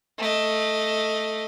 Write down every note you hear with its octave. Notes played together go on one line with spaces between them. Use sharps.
A3 D#5